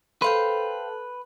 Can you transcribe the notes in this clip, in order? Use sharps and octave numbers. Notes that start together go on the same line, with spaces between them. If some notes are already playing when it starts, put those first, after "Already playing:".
A4 B4 C5 F5 G5